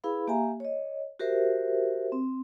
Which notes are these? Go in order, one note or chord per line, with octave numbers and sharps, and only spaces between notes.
E4 G#4 B4 F5 B5
A#3 G4 E5 F5 G#5 A#5
C#5 D#5
F#4 G4 A#4 C5 E5
C4